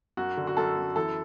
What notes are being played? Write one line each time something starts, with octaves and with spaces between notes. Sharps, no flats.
F#2 F#4
D3
F#4
F#2 A4
F#2
E3 A4